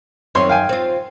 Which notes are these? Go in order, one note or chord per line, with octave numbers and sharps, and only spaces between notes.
F#2 D#3 C4 C#5 C6
F5 G5 G#5
C4 F4